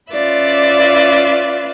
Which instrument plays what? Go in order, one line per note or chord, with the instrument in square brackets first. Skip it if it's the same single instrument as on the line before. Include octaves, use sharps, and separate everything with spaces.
[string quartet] C#4 F4 B4 D5 E5